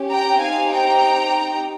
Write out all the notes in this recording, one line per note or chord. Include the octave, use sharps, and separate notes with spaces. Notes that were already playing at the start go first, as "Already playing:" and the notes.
Already playing: C#4 G4
G5 A#5
C4 D#4 G4 F5 G#5
G5 A#5